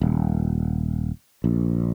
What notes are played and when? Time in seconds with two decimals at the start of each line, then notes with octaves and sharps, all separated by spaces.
0.01 D#1
1.44 A#1